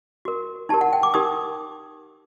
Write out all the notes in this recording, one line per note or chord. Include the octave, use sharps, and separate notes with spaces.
F#4 A#4
D#4 G4 A#4 A5
F#5
G5
D6
D#4 G4 A#4 D#6